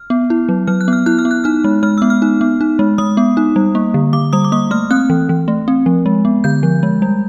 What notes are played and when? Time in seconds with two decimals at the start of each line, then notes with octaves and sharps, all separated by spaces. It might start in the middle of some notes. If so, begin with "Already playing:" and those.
Already playing: F6
0.10 B3
0.30 E4
0.49 F#3
0.67 F#3 F6
0.81 F#6
0.88 B3 F6
1.06 E4 F#6
1.19 F6
1.25 B3
1.31 F#6
1.44 D#4 F6
1.64 G#3
1.83 G#3 F6
1.98 B3 E6
2.10 F6
2.22 D#4
2.41 B3
2.61 D#4
2.79 G#3
2.98 G#3 D#6
3.17 B3
3.37 D#4
3.56 G3
3.75 A#3
3.94 D3
4.13 D3 D6
4.33 G3 D#6
4.44 D6
4.52 A#3 D#6
4.71 A3 F6
4.91 C4 F#6
5.10 E3
5.29 E3
5.48 A3
5.68 C4
5.86 F3
6.06 G#3
6.25 B3
6.44 D3 G6
6.63 F3
6.83 G#3
7.02 G3